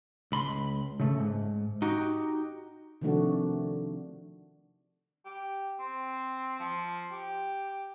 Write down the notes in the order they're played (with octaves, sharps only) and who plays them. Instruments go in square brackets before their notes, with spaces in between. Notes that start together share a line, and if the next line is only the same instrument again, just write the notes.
[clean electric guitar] C#2 B5 C6
C#3 A3
G#2
D#4 F#4 G4
[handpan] C3 D#3 F3 A3 D4 F#4
[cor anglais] G4
C4
F3
G4